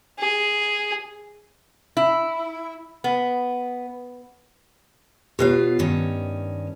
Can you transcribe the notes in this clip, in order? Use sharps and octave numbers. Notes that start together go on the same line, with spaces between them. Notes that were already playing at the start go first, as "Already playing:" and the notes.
G#4
E4
B3
B2 F4 G4 B4 C#5 F5
G2 D#3 C#4